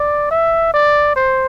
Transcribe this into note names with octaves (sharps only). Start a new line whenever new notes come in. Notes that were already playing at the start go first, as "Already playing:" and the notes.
Already playing: D5
E5
D5
C5